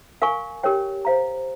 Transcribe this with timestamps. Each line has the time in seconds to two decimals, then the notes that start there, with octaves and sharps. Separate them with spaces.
0.22 A#4 F5 G#5 C#6
0.63 G4 A#4 C#5 G5
1.05 C5 F5 A#5